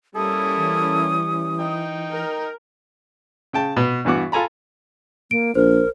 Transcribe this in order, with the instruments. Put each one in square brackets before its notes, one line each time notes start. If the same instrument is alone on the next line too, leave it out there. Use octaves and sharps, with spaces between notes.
[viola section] G3 C#4 [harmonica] A#3 E4 A4 [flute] D#6
[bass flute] E3
[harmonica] D#4 G5
[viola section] A#4
[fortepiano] C#3 G5 A5
B2 B4
G2 E3 B3 F#4 D6
F4 A4 G#5 A#5 B5
[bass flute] A#3 [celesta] D7
[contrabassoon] A#1 [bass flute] A#4 [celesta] C5